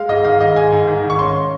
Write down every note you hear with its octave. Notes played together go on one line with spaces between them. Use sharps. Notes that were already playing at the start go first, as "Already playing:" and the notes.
Already playing: G#3 F5
G#2 D#5
D#3 F5
G#2 D#5
G#3 G#5
G#2
D#3
G#2
C#6
C#4 C6